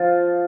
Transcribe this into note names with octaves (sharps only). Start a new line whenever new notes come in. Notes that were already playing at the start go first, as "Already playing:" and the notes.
Already playing: F3 F4